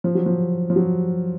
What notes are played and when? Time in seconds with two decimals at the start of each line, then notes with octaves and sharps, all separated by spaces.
0.04 F3
0.15 F#3
0.26 F3
0.70 F3
0.76 F#3